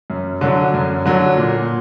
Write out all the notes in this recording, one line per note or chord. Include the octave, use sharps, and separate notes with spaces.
F#2
D3 F#3
F#2
D3 F#3
A#2